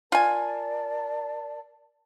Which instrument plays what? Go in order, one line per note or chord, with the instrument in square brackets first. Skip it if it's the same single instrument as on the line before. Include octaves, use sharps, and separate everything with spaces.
[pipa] F4 G#5 [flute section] A#4 D5 A5